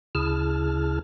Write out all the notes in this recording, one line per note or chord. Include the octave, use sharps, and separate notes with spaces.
D2 C#3 E4 G#4 A5 F6